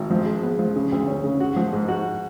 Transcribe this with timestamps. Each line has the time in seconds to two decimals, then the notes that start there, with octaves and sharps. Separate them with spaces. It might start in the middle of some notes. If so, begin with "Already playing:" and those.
Already playing: G#1
0.11 F3
0.26 G#3
0.43 B3
0.59 F3
0.76 C#3
0.92 D2
1.08 C#4
1.24 C#3
1.40 F#4
1.56 F3
1.73 G#2
1.88 F#4